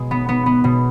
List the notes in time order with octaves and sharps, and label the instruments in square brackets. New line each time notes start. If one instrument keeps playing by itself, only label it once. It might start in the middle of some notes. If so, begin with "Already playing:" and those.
Already playing: [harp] B2 G#3
B3
B3
B3
B2